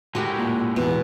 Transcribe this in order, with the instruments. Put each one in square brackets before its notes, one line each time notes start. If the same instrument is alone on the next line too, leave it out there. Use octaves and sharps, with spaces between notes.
[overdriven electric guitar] A2 G#3 [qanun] F#4 G4 A#4
[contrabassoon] A#2
[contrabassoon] E2 [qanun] B2